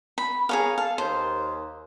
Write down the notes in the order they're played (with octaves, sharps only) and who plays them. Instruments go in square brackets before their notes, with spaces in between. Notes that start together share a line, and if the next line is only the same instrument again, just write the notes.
[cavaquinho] B5
[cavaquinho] G#4 C#5 F5 [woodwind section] A#4 G#5
[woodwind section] A4 [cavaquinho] F5
[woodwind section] D#2 [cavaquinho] C5